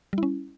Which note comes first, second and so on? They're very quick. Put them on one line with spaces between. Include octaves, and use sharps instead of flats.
G3 E4 C#4